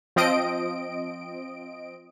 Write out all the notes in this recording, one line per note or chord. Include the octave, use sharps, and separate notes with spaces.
F3 C4 D#5 D7